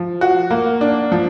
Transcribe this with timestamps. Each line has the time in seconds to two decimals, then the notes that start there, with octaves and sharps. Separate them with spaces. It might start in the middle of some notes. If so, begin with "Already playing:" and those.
Already playing: F3
0.21 F#4
0.50 A#3
0.81 D4
1.12 F3